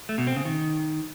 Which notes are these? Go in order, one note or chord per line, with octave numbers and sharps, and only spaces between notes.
A3
B2
C4
C#3
D#3